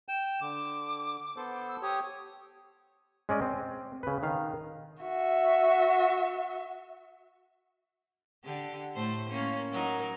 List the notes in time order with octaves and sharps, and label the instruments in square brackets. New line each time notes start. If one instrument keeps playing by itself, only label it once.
[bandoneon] G5 [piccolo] E7
[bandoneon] D3 [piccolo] D6
[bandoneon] B3 A4 C5
[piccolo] E6
[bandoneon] G4 C#5 [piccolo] D#6
[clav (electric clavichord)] G#3 C#4 D5 D#5
C4
C#3 B4
D#3 F5
[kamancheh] F#4 E5
[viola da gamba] D3 G4
A2 A3 C5
A#3 C#4
F#3 D#4 A#4